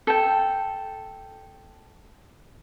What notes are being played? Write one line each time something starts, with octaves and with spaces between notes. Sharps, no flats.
A4 G5